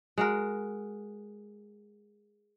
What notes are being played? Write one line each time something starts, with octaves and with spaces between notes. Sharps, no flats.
G#3 F#4 A#4